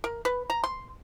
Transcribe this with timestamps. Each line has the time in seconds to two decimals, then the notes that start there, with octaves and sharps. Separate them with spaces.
0.04 A#4
0.25 B4
0.50 A#5
0.64 C6